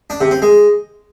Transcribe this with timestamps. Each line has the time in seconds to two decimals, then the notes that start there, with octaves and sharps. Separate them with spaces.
0.10 D4
0.21 C3
0.31 C4
0.42 G#3